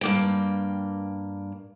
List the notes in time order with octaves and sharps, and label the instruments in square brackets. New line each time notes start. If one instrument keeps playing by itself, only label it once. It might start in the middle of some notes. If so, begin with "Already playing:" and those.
[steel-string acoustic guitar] G2 A#3 G5